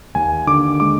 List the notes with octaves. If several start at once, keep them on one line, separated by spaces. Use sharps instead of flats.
D#2 G#5
D3 D6
G#3 D6